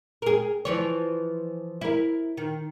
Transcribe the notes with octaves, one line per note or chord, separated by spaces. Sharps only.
G#4 A#4
E3 F3 C#5
E4 A#4
D#3